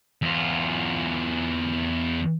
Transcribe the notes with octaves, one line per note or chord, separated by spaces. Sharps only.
E2 F4